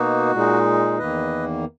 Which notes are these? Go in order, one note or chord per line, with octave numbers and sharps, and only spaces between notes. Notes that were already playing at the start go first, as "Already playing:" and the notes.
Already playing: B2 A#3 D#4 F#4
A#2 G#3 D#4
E2 D#3 A#3 B4 D#5